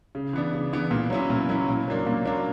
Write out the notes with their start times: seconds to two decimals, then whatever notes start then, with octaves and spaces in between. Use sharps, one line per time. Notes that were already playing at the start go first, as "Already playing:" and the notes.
0.15 C#3
0.33 E3 B3 D4
0.53 C#3
0.73 E3 B3 D4
0.91 A#2
1.10 F#3 C#4 E4
1.30 A#2
1.49 F#3 C#4 E4
1.68 A#2
1.88 F#3 A#3 D4
2.06 A#2
2.25 F#3 A#3 D4